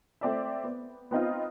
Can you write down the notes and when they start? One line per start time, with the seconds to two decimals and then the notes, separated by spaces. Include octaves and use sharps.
0.21 A3 C4 D5 E5
0.64 B3
1.11 B3 C4 D#4 F4